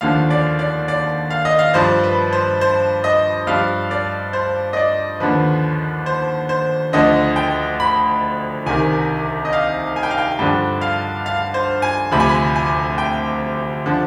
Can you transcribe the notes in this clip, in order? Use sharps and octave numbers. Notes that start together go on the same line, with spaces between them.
D#2 D3 F3 F5
D5
D5
D5
F5
D#5
F5
G2 F3 C5
B4
C5
C5
D#5
G2 F3 F5
D5
C5
D#5
D5
D#2 D3 F3 B4
C5
C5
D2 D3 F3 D#5
G5
B5
C2 C3 D#3 G#5
D#5
F5
G#5
G5
F5
G5
G2 D3 F3 G5
F5
F5
C5
G#5
D2 C3 F3 B5
G#5
B5
G#5
G5
D3 F3